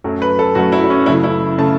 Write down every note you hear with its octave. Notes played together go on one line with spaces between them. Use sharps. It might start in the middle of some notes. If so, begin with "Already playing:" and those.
F#2 F#3 A3
B4
A4
F#2 F#3 A3 F#4
E4
E4
C#4
F#2 C#3 A3 E4
E4
C#3 A3 A5